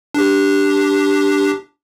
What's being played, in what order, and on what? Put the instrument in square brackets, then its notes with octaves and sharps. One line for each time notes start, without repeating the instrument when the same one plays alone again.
[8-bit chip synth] D4 G4